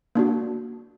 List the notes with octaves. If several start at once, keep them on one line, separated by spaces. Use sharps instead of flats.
A#3 D4 F#4